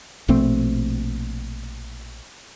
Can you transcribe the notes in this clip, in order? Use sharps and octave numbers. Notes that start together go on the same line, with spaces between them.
A#1 B2 A3 C4